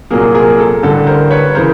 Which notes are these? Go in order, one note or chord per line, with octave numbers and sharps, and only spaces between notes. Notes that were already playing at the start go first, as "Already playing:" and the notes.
C2 A#2 F#3 A#3 G#4 A#4
G#4 A#4
A4
A1 G2 D3 A4
A#4 C5
B4 C#5
C#3 E3 A#4 C5